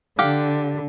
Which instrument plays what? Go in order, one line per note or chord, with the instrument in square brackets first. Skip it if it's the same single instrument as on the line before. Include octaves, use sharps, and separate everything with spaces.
[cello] D3 [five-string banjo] G4 F5 F#5